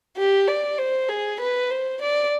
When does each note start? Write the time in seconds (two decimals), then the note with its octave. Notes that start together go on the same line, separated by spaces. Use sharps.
0.17 G4
0.47 D5
0.78 C5
1.08 G#4
1.40 B4
1.70 C5
2.01 D5